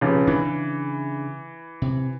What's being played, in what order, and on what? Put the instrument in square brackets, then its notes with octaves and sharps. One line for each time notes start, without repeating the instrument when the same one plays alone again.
[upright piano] F1 C#3
[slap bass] C#3 D4 [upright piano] E3
[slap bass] C3